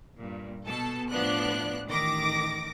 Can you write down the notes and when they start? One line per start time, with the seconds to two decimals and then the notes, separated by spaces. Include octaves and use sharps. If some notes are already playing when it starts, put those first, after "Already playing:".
0.19 G2 A#2
0.67 B2 A4 A5
1.10 A2 F3 B3 D4 F#6
1.88 A1 D#3 D6 A#6